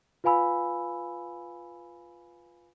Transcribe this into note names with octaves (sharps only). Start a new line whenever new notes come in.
F4 B4 F5 G#5 B5 E6